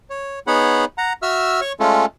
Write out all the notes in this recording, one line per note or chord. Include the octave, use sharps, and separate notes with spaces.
C#5
B3 D#4 G#4 C#5 F#5 B5
F#5 A#5
F#4 E5 E6 F6
C#5 C#6
G#3 A3 C#4 F4 A4